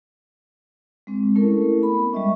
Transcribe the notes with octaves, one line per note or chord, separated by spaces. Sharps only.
G#3 C4
A3 C#4 E4 A4 A#4
B3 B5
G3 G#3 D#5 E5 C#6